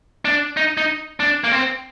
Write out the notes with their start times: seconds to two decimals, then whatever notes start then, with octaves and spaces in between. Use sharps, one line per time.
0.25 D4
0.57 D#4
0.78 D#4
1.20 D4
1.44 A#3
1.52 C4